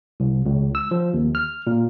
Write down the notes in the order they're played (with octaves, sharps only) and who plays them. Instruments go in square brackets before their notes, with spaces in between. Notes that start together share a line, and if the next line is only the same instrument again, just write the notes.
[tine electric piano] C2
C#2
E6
F3
D#2
F6
A#2